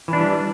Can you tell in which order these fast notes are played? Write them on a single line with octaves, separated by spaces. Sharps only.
E3 D4 G3